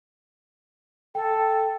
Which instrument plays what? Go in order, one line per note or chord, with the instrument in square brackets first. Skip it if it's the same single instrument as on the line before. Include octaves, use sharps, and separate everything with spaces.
[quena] A4 [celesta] G5